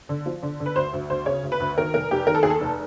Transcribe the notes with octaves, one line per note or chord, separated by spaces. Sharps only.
D3
F3
D3
D3
B4
D2 C5
D2
D2 C5
C#3 C#5
D2
B4
D2
D#3 A#4
F1 A#4
F1 G4
D#3 A#4
A4
D#2 G#4
A4
F1